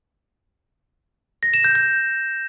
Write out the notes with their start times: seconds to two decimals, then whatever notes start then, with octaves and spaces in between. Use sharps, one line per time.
1.43 A#6
1.54 E7
1.64 G6
1.75 G6